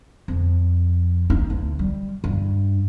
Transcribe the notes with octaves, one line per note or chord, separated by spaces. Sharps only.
F2
D#4
D2
G3
G2